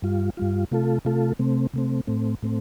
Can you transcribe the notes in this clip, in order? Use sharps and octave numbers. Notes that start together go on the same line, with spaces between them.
G2 G3 F4
G2 G3 F4
C3 A3 F4 A4
C3 A3 F4 A4
C3 A3 C4
C3 A3 C4
A2 A3 C4
A2 A3 C4